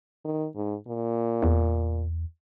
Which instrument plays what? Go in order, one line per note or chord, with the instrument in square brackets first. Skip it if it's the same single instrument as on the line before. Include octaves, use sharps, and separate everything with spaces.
[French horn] D#3
G#2
A#2
[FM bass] E2